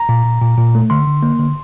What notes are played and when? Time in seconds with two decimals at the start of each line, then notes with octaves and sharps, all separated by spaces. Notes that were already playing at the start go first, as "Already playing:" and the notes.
Already playing: A#5
0.09 A#2
0.25 A#2
0.42 A#2
0.58 A#2
0.75 A3
0.90 D3 C6
1.07 D3
1.23 A#3
1.39 D3